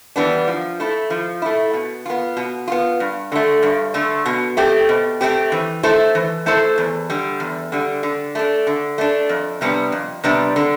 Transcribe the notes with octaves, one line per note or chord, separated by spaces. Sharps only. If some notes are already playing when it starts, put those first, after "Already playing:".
E3 G3 B3 D4
F3
A3 E4
F3
A3 E4
B2
B3 F4
B2
B3 F4
G2
D3 A3
G2
D3 A3
B2
A3 C4 G4
B2
A3 C4 G4
E3
A3 E4 A4 C5
E3
A3 E4 A4 C5
E2
D3 G3
E2
D3 G3
D3
A3 D4
D3
A3 D4
F2
C3 G3 B3 D4
F2
C3 G3 B3 D4
D3